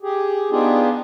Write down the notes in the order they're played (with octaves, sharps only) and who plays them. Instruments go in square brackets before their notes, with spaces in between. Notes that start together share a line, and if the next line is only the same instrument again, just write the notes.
[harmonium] G4 G#4
B3 D4 D#4 F4 G4 G#4